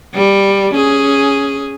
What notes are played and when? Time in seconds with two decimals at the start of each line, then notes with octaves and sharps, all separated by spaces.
0.15 G3
0.74 C#4 G#4